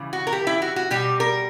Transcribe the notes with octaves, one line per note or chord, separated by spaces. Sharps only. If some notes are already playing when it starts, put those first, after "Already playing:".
Already playing: C#3 E3 G3
F#4
A#4
G4
E4
F#4
F#4
B2 G3 G4
A#4